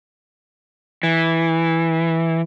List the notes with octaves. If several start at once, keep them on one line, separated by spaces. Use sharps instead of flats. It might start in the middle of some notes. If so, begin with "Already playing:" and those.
E3